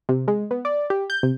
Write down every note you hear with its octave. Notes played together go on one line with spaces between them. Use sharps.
C3
G#3
B3
D5
G4
G6
C3